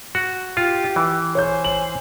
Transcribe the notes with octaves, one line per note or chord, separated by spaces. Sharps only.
F#4
F4 G4
E3
C5 C#5 G#5 G6
F#7